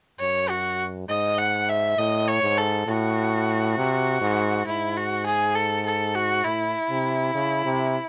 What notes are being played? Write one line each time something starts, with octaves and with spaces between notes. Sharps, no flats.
F#2 C#5
F#4
G#2 D#5
F#5
E5
A2 D#5
C#5
G#2
A4
A2 F#4
C3
G#2
G#2 E4
F#4
G#4
A4
A4
F#4
A2 E4
C3
C#3
C3